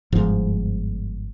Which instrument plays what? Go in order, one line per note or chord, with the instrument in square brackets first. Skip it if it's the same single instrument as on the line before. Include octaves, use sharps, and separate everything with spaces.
[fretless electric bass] G1 G#2 F3